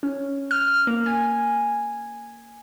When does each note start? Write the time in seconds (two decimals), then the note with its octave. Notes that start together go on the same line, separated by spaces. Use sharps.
0.03 C#4
0.51 F6
0.87 A#3
1.06 G#5